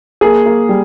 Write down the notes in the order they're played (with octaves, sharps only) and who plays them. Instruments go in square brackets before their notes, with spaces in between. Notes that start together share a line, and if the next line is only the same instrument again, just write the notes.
[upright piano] A#3 G#4
A#3
G3